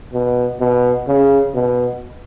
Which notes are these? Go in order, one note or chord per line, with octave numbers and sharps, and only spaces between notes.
B2
B2
C#3
B2